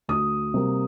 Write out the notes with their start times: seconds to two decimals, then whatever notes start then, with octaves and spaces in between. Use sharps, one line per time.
0.08 D2 D#6
0.54 C3 G3 A#3